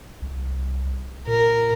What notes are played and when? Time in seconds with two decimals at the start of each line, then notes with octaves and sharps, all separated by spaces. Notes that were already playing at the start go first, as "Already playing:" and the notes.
0.22 C2
1.27 A#2 A#4